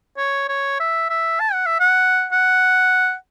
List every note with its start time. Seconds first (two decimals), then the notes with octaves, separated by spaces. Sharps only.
0.18 C#5
0.48 C#5
0.80 E5
1.10 E5
1.40 A5
1.53 F#5
1.66 E5
1.80 F#5
2.32 F#5